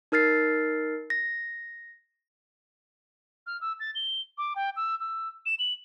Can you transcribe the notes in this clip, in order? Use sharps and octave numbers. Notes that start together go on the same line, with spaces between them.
D#4 A#4 F6 A6 C7
A#6
F6
E6
A6
G7
D6
G5
E6
E6
E7
F#7